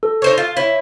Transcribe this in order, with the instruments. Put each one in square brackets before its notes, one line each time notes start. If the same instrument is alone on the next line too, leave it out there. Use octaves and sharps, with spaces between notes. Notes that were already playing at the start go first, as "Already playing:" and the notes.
[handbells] A4
[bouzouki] D#4 C5 C#5
F4
[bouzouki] E4 [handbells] C#5